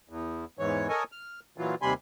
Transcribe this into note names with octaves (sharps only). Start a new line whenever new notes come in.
E2
E2 G#2 E3 C#5
A4 A#4 C#5 D#5 G#5
F6
A#2 E3 F#3 F4
D#2 C3 G3 G#5 B5 C6